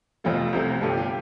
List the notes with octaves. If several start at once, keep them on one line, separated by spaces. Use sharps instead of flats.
F1 F2 F3 A3 F4
C2 C3 F3 A3
G1 G2 G3 A4
G4
F4
G4